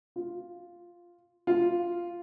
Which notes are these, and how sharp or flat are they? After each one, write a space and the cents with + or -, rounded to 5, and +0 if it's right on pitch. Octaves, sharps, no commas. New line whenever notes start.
F4 +0
F4 -5